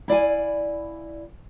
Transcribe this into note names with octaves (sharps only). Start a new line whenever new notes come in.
E4 D5 F5 G#5